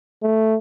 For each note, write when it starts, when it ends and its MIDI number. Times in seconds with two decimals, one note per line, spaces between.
0.22 0.57 57